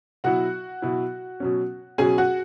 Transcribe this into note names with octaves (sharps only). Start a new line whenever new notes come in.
B2 F#3 E4 F#4 F#5
B2 F#3 E4
B2 F#3 C#4
B2 F#3 C#4 G#4 G#5
F#4 F#5